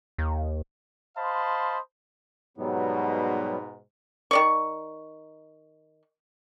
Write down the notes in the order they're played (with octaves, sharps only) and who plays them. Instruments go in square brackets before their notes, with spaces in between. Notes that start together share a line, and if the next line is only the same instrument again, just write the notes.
[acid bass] D#2
[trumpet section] C5 D#5 F5 A5 B5 C6
[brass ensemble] G#2 B2 [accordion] F#3 G3 B3
[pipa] D#3 D5 C#6